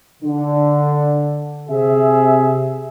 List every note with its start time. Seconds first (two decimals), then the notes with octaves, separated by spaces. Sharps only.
0.23 D3
1.70 C3 G#4 E5